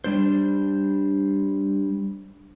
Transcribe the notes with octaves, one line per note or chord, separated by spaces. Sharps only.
G3 D4 C5